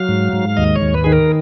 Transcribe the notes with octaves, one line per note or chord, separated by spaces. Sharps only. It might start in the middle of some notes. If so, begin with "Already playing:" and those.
Already playing: F#3 F5
G#2
G#2
D#2 D#5
C#5
D#2
B4
D#3 G#4
A#4